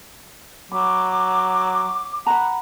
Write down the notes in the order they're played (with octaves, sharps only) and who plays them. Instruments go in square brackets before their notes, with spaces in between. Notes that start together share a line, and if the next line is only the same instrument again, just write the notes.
[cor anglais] F#3 [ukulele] B5 [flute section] D6
[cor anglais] F#5 [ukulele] A#5 B5